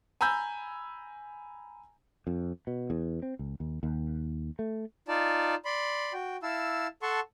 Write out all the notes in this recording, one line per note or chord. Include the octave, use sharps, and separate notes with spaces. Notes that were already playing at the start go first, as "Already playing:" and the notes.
G#5 A#5 B5 E6 G6
F2
B2
E2
C4
C#2
D#2
D#2
A3
D#4 F4 D5 A5
D5 B5 C6
F#4 G5
E4 F5 A5 E6
A4 F#5 A5 C6 C#6